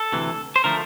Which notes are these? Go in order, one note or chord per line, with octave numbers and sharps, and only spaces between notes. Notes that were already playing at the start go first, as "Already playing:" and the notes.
Already playing: A4
D2 C3 E3
C5
D3 F3 A3 A#4